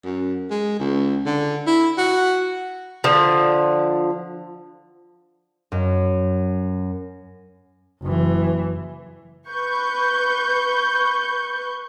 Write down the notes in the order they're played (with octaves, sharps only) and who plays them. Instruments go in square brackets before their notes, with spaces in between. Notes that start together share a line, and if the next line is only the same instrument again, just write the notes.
[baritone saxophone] F#2
G#3
C#2
D3
E4
F#4
[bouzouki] D3 F3
[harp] F#2
[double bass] F#1 E3
[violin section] B4 C#6 G6